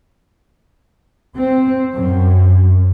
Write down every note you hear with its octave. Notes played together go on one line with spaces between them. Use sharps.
C4
F#2